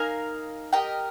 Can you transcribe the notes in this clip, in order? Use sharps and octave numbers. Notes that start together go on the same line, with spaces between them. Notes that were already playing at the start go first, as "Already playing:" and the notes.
Already playing: D#4 A#4 F5 G#5
G4 A#4 D#5 G5